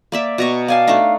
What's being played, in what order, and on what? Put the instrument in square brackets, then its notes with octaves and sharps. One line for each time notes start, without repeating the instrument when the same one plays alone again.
[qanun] A#3 D5 E5
B2 A#5 C#6
[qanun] D5 G#5 A5 [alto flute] F5
[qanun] A3 D4 D#4